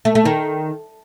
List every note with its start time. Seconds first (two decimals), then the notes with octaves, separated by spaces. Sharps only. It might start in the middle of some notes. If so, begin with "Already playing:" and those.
0.05 A3
0.15 A3
0.25 D#3